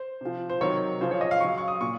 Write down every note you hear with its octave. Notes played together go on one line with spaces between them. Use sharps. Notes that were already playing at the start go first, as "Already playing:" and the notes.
Already playing: C5
C3 F3
C5
C3 D#3 F#3 C#5
C#3 F3 C5
C#5
D#5
F5
C#3 F#3 C#6
C#6
D#6
A#2 C#6